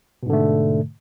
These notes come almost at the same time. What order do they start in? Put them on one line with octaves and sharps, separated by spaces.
B2 G#2 D3 A3